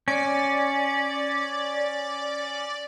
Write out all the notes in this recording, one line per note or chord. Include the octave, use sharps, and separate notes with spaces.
C#4 D5